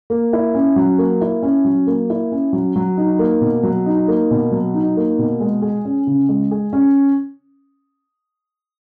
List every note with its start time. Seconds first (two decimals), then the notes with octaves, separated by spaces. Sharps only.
0.10 A#3
0.33 E4
0.55 C#4
0.76 F#3
0.98 A#3
1.21 E4
1.43 C#4
1.65 F#3
1.87 A#3
2.10 E4
2.32 C#4
2.53 F#3
2.76 F#3
2.97 D#4
3.19 A#3
3.41 B2
3.63 F#3
3.86 D#4
4.08 A#3
4.31 B2
4.52 F#3
4.74 D#4
4.97 A#3
5.19 B2
5.40 G#3
5.62 G#4
5.85 C#4
6.07 C#3
6.29 G#3
6.51 G#4
6.73 C#4